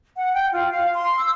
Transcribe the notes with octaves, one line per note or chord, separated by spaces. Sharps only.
F#5
G5
F4
F5
C6
E6